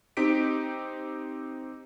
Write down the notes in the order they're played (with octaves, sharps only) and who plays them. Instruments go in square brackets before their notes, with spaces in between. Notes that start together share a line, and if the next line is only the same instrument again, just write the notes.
[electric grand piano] C4 D#4 G4 B6 D7